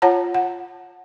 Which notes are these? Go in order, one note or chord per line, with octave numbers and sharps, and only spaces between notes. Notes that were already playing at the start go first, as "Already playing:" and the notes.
F4 C#5 F#5 A5 A#5
F#5